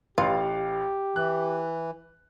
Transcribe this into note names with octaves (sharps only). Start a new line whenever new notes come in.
A1 F4 G4 B4 F5
E3 F#6